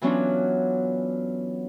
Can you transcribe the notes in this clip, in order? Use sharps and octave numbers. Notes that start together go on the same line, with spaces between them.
E3 F#3 B3 C#4 D4 F4